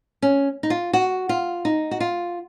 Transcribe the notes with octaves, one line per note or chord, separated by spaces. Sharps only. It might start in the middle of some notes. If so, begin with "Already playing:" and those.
C#4
D#4
F4
F#4
F4
D#4
F#4
F4